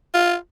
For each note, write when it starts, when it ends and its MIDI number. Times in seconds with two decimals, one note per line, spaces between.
0.14 0.35 65